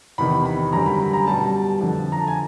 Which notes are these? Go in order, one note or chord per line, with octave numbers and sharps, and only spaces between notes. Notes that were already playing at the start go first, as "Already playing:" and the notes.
E2 C3 D#3 B5
B5
F#2 D3 G3 A#5
B5
B5
A#5
B2 G3 A5
F2 D3 F3
A#5
A5
G#5